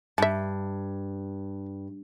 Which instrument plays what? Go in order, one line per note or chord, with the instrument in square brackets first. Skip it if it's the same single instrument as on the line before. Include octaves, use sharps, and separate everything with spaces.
[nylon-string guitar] G2 [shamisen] E5 A5